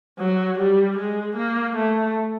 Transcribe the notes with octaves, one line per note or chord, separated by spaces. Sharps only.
F#3
G3
G#3
A#3
A3